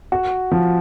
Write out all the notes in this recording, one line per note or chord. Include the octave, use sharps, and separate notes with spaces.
F#4
F3